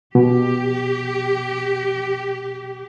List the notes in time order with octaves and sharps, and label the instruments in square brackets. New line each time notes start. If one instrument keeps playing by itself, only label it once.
[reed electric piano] B2 [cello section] G4